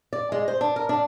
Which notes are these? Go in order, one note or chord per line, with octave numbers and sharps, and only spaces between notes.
D5
G#3
C5
D4
A#4
D4